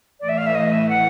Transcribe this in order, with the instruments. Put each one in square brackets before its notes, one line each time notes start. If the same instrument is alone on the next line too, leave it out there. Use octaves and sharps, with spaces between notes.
[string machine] A2 E3 A3 [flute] D5
[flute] E5
F5
E5
D#5
E5
F#5